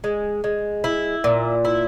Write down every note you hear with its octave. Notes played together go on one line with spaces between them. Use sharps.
G#3
G#3
E4
A#2
E4